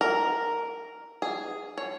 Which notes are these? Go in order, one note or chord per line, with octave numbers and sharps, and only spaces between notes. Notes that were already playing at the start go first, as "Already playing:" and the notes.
A#4
G#4
C#5